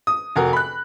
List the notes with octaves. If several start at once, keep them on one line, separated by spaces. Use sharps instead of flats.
D#6
F1 F#4 A#4
B5 F#6